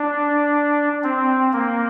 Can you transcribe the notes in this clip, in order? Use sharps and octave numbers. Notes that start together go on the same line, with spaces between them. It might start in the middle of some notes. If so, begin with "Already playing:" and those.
Already playing: D4
C4
A#3